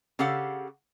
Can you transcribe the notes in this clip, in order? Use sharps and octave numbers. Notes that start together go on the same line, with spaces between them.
C#3 G4 A4 F5 F#5